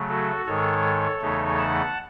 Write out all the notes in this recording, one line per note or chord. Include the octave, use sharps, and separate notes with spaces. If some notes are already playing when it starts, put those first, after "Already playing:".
Already playing: C#3 F#3 A3
F#4 A4
G#2 D#3 G#3 A4 C#5
E2 C#3 E3 A3 D#4
F#5 A5